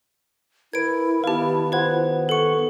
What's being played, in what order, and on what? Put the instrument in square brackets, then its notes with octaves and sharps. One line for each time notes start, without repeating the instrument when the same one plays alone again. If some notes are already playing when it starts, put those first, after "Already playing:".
[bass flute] E4 [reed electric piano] A#4 B4 [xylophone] G#6 D7
[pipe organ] D#3 B3 [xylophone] G4 B4 [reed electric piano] F5 A5
[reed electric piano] F4 C5 F#5 [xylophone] B4 G#6
[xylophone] A4 C#7 [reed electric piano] F#5 C#6